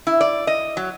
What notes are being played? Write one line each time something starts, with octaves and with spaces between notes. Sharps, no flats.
E4
D5
D#5
F#3